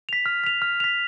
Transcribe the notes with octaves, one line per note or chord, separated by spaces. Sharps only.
B6 F7
F6
B6 F7
F6
B6 F7